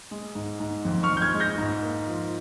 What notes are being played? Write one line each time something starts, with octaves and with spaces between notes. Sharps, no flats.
G#3
G#2
G#2
F2
C#6 F6
F2
G6
F6 G#6
G#3
G6 A#6
G#2
A#3
F3